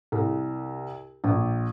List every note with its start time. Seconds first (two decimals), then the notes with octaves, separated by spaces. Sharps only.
0.12 C2
1.24 A#1